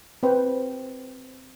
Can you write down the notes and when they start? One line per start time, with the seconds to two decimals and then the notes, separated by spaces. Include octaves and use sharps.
0.23 C4 B4 C5 G5